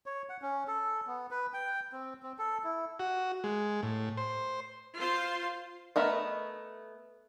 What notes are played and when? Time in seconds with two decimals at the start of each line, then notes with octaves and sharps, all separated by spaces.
0.06 C#5
0.29 F#5
0.42 C#4
0.68 A4
1.07 B3
1.31 B4
1.53 G5
1.92 C4
2.23 C4
2.38 A4
2.64 E4
2.99 F#4
3.44 G#3
3.83 A2
4.17 C5
4.96 F4 C5 C6
5.96 A3 B3 A#4 D#5